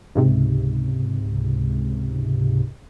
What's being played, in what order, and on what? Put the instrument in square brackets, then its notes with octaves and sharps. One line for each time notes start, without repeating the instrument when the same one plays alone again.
[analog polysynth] C#2 G#2 C3